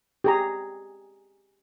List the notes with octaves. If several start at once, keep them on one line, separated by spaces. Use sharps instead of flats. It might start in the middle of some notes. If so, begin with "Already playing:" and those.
G4 G#4 A#5